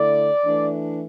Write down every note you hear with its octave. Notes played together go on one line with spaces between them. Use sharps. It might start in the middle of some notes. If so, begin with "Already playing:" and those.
Already playing: D3 A3 E4 D5
E3 A3 D4